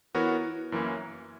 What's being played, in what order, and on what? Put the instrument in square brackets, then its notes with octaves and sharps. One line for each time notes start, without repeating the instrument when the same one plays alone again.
[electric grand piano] E3 B3 F#4 A#4 C#5 [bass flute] E4
[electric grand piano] F#2 E3 A#3 C#4 E4